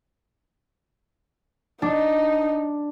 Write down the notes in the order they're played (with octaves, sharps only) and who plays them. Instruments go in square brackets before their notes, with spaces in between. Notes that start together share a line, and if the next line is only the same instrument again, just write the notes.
[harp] D4 [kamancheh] D#4